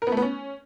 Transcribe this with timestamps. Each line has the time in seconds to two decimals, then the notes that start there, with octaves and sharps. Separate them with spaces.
0.02 A#4
0.07 B3
0.12 A3
0.17 B3
0.22 C#4